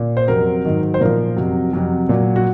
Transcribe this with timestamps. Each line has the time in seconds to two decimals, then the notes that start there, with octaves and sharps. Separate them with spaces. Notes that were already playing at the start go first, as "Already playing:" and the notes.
Already playing: A#2
0.17 C5
0.28 F2 C3 F#3 A#4
0.65 G#2 D#3 F#3
0.94 C5
1.00 A#2 F3 A#4
1.37 F2 C3 F#3
1.73 F2 C3 F#3
2.09 A#2 F#3
2.36 F#4